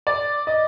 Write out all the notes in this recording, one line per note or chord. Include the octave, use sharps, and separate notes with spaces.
D5
D#5